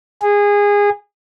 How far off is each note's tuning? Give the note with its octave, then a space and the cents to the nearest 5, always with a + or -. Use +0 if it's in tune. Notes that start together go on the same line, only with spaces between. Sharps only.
G#4 -20